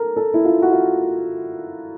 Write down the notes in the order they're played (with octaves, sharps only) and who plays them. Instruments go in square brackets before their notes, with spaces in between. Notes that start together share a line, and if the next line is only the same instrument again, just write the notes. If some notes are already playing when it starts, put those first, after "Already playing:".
Already playing: [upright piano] A4 A#4
A4
E4
F4
F#4
F4